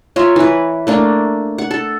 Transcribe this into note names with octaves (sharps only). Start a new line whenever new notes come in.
F4 C#5 E5 A#5
E3 B4
A3 A#3 D4
F#5
A4